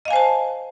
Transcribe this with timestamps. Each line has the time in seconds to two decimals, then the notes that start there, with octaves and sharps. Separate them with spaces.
0.05 D#5
0.08 F5
0.11 G#5
0.13 C5
0.16 A5